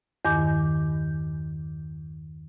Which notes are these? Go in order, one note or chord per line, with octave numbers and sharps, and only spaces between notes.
E2 G2 D#3 D6 G6